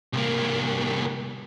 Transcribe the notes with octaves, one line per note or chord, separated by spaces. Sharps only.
C2 A#3